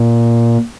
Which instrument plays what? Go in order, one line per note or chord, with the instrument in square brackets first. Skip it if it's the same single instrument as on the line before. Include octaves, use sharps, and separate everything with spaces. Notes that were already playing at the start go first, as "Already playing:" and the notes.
Already playing: [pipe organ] A#2